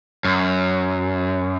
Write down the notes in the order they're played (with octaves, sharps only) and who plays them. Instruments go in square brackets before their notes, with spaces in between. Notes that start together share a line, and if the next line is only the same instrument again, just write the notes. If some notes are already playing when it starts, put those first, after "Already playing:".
[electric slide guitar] F#2